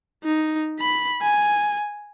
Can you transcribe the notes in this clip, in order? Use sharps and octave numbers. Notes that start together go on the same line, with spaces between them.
D#4
B5
G#5